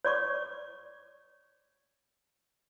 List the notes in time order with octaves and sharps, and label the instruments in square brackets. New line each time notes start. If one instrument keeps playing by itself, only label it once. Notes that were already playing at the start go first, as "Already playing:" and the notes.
[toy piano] C#5 D5 C#6 D6